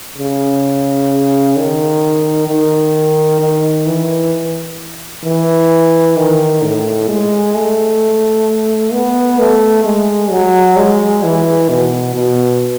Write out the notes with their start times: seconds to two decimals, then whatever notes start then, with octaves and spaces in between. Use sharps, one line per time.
0.18 C#3
1.56 D#3
2.47 D#3
3.40 D#3
3.86 E3
5.24 E3
6.16 D#3
6.62 A2
7.08 G#3
7.54 A3
8.93 B3
9.39 A3
9.84 G#3
10.30 F#3
10.77 G#3
11.23 E3
11.69 B2
12.15 B2